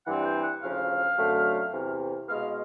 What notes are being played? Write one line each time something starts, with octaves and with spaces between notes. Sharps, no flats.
G2 E3 G3 C4 F#5
G5
F#5
D2 C#3 F3 F5
F#2 D3 F#3 A3 C4
E2 C3 E3
B2 G#3 B3 F5